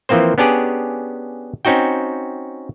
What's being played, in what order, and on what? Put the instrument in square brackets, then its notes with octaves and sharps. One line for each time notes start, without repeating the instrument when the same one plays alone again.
[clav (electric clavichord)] E3 F3 A#3 C4 C5
B3 C#4 D4 G4 G#4 D5
C4 C#4 D#4 F#4 G5